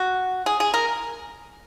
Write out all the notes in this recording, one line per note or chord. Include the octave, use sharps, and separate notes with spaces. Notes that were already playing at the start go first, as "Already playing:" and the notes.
Already playing: F#4
G#4
G#4
A#4